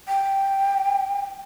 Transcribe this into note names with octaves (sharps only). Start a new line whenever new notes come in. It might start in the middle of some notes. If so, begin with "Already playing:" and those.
G5